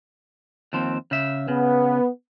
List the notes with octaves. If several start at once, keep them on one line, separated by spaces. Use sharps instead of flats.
D#2 F3 C4
C#3 E5
C#3 B3